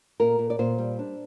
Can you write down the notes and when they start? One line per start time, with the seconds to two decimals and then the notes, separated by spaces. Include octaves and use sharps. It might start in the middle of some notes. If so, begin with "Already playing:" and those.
0.20 A#2 A#4
0.39 A#2
0.50 D5
0.59 A#2 C5
0.78 G3
0.99 D4